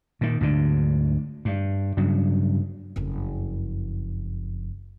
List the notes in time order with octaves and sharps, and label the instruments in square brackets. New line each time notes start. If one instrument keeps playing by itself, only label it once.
[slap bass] A#2 D#3
D2 G#2 D3
G2
G2 C#3 F#3
[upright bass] F#1 F2